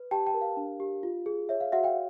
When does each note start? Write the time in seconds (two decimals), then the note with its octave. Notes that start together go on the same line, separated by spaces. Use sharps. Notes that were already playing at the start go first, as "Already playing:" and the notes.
Already playing: B4
0.11 G4 G5 A5
0.27 G5 A5
0.34 A#4
0.41 F5
0.57 D4
0.80 G4
1.03 F4
1.26 G#4
1.49 C#5 E5
1.61 F5
1.72 F#4 E5 F#5
1.84 F5 G5